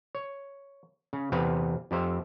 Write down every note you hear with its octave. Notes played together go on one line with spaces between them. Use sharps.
C#5
C#3
E2 C3 C4 B4 F5
F2 G4 C5 E5 F5